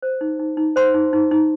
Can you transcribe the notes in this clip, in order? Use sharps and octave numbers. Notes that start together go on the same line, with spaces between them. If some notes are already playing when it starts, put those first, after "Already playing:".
C5
D#4
D#4
D#4
C5 C6
D#4
D#4
D#4